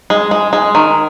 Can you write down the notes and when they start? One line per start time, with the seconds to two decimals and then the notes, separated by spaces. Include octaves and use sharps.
0.10 G#3
0.31 G#3
0.53 G#3
0.75 D#3